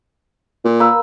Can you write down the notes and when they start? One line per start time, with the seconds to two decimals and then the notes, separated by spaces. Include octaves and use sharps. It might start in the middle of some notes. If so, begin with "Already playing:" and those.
0.64 A#2
0.80 A#3 B4 E6